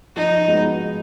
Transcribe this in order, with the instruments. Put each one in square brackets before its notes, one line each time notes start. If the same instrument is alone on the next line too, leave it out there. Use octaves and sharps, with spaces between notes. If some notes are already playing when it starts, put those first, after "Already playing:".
[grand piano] F3 [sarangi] D#4
[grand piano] G#3 B3 F#4 B4